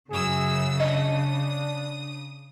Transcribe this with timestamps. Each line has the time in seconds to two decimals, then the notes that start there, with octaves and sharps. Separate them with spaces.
0.11 F#2 C#3 G#4 E6
0.80 D4 D#5 D#6